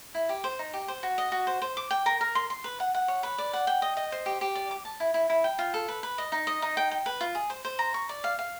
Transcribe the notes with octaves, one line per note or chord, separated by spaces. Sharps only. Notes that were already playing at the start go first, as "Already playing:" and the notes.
E4
G4
C5
D#4
G4
C5
F#4
D#5
F#4
C5
C5
D6
G5
A#4
A#4
C6
C6
B4
F#5
F#5
C#5
B4
D5
F#5
G5
D#5
D#5
C5
G4
G4
D5
D6
A5
E4
E4
E4
G5
F4
A4
B4
B4
D#5
D#4
D#5
D#4
G5
G5
B4
F4
G#4
C5
C5
A#5
C#6
D5
F5
F5